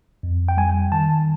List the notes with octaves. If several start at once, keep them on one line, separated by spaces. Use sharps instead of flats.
F2
G5
G3 G#5
D#3 A5